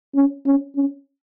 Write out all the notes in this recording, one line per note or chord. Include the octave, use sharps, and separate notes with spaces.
C#4
C#4
C#4